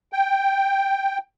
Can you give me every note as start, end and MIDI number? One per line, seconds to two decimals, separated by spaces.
0.13 1.18 79